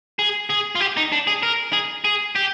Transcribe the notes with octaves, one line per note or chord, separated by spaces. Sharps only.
G#4
G#4
F4
G4
D#4
D4
G#4
A#4
G#4
G#4
G4